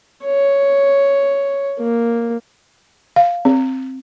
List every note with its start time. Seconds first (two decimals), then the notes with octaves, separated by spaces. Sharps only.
0.25 C#5
1.79 A#3
3.16 F5
3.45 C4